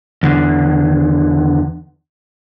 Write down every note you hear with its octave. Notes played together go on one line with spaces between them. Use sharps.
E2 D3